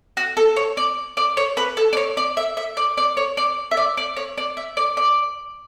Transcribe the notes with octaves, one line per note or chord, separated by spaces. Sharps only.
F#4
A4
C#5
D5
D5
C#5
B4
A4
D5
C#5
D5
E5
E5
D5
D5
C#5
D5
E5
D5
D5
C#5
D5
E5
D5
D5